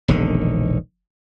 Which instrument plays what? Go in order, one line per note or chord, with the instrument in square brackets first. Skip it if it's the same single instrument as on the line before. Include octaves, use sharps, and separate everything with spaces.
[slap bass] E1 A#1 D3 D#3